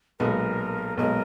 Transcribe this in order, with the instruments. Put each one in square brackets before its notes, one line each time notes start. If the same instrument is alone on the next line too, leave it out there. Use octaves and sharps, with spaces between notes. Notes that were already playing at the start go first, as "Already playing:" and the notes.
[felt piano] B1 A#2 G#3 B3 [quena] A#4
[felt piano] B1 A#2 G#3 B3 [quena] A#4